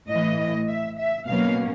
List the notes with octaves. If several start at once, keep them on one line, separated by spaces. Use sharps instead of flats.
A2 E3 A3 D#5
E5
E5
B2 F#3 A#3 C#4 F5